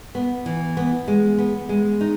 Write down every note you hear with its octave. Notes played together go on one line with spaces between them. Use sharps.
B3
E3
B3
G#3
B3
G#3
D#4